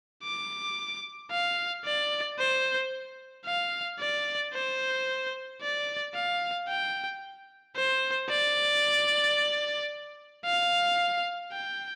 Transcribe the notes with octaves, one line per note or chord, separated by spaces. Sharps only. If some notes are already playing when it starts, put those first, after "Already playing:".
D6
F5
D5
C5
F5
D5
C5
D5
F5
G5
C5
D5
F5
G5